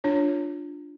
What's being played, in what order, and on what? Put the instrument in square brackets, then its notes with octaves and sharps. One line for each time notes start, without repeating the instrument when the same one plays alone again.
[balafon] D4 F4 C#5